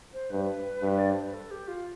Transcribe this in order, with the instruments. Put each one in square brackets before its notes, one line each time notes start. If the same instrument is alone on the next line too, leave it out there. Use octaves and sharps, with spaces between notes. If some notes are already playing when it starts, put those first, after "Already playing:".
[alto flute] C5
[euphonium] G2 [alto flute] B4
[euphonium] G2
[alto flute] D5
C5
B4
A4
G4
F4